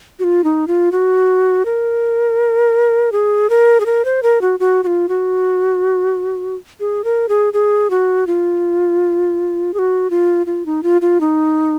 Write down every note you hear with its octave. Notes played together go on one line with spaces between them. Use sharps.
F#4
F4
D#4
F4
F#4
A#4
G#4
A#4
G#4
A#4
C5
A#4
F#4
F#4
F#4
F4
F#4
G#4
A#4
G#4
G#4
F#4
F4
G#4
F#4
F4
F4
D#4
F4
F4
D#4